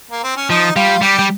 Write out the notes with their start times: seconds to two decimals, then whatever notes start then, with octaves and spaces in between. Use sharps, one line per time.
0.11 A#3
0.23 C4
0.37 C#4
0.50 F3 D#4
0.76 G3 F4
1.01 G3 G4
1.19 G3